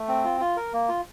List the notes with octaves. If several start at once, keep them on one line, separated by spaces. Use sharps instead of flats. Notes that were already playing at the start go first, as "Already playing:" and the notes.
Already playing: A3
C4
F4
F4
A#4
A#3
F4